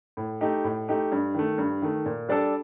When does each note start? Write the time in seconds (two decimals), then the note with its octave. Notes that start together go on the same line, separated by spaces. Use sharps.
0.17 A2
0.41 A3 D#4 G4
0.64 A2
0.89 A3 D#4 G4
1.12 G2
1.35 D#3 A3
1.58 G2
1.82 D#3 A3
2.06 A#2
2.29 G3 D4 A4